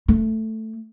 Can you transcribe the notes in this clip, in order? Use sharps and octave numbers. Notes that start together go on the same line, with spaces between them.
A3